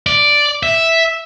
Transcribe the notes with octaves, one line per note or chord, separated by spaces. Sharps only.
D5
E5